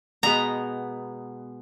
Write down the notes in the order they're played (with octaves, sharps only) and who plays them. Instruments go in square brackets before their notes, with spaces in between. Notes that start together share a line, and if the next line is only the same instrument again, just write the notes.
[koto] B2 G#3 B3 A#5